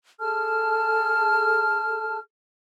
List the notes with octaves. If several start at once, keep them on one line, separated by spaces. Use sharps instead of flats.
G#4 A4 A5 F6